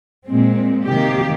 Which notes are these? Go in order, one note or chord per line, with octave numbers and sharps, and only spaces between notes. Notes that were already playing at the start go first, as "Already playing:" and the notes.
A#2 G#3 C4
C3 D#3 A#3 G4